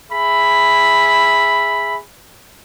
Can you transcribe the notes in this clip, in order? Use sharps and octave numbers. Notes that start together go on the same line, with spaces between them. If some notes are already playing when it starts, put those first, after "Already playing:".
G#4 E5 B5